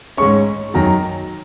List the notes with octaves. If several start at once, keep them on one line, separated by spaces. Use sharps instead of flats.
G#2 G#3 C#4 C#6
F#2 D#3 F#3 A#5